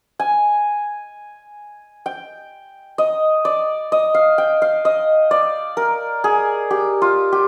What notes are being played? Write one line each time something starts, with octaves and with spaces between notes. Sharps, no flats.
G#5
G5
D#5
D5
D#5
F5
G5
F5
D#5
D5
A#4
G#4
G4
F4
G4